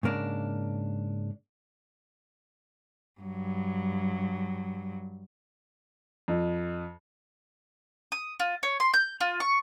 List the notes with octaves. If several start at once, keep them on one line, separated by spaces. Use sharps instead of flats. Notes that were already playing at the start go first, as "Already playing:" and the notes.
G#2 C#3 A#3 D4
G2 F#3
F2
D#6
F4
C#5
C6
G6
F4
C#6